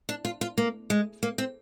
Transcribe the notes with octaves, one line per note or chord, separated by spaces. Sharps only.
D4
F4
F4
A#3
G#3
A#3
C4